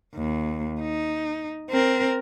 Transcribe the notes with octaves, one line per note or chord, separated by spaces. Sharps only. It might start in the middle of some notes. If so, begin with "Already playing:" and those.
D#2
D#4
C4 A#4